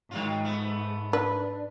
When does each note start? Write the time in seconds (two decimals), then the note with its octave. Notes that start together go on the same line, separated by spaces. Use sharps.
0.11 G#2 D#3 F#3 F4
0.44 A3 B3
1.13 D4 B4